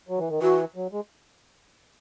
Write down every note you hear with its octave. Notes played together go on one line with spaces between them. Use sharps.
F#3
E3
D#3
E3 F#4
F#3
G#3